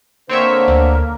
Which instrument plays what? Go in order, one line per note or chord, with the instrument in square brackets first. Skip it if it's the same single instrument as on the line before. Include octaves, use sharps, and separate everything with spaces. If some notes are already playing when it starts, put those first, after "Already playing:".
[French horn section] D3 C5 [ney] A#3 [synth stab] C4 C#5 E5
[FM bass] D2